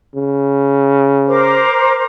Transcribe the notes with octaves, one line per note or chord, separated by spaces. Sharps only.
C#3
A#4 C5 D6